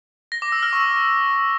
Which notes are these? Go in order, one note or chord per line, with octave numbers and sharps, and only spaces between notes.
A#6
D6
E6
F6
C#6